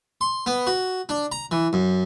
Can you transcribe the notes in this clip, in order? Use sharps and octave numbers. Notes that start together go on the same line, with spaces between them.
C6
B3
F#4
D4
A#5
E3
F#2